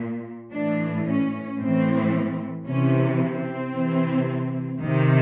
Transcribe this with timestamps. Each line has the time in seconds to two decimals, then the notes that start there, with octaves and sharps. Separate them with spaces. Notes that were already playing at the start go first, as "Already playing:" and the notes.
Already playing: A#2
0.52 A2 E3 D4
1.06 C#4
1.58 A2 E3 C4
2.66 C3 E3 C#4
3.19 C4
3.73 C3 E3
4.79 C3 D#3